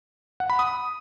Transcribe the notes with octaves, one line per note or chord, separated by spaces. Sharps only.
F#5
B5
D#6